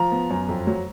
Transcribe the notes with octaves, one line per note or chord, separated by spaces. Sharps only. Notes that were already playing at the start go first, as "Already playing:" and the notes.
Already playing: F3 A#5
B3
F#2
F2
F#3